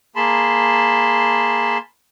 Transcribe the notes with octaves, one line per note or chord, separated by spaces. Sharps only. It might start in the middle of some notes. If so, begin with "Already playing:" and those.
A#3 G#4 A5 B5 C6